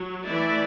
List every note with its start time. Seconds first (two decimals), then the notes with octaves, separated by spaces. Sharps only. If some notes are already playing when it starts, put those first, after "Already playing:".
Already playing: F#3
0.25 E3 A3 E4 D5